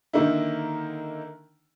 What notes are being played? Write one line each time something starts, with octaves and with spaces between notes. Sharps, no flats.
D3 D#3 A#3 D#4 E4